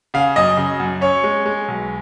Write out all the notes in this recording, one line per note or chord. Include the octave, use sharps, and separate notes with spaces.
C#3 F5
F#2 D#5
C#3
F#2
C#4 C#5
G#3
G#3
B1